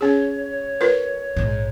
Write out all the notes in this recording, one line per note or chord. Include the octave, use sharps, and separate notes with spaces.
C#4 G#4 C#5
F4 A#4 B4
A#1 G#2